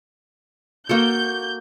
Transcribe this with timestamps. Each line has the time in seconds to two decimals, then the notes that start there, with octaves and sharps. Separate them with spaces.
0.89 A#3 F#4 A4 G6